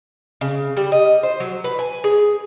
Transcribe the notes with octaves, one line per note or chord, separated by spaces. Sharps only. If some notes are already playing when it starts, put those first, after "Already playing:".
C#3
G3
D#5
C5
F#3
B4
G#5
G#4